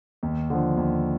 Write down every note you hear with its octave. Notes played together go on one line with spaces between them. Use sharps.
D#2
D3 F3
D#2